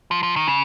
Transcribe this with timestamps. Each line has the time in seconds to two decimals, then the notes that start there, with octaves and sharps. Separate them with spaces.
0.11 F3
0.23 F3
0.36 D#3
0.47 C#3